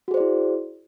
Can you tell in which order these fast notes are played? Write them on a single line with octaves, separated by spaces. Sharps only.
F#4 G#4 C5 D5 E4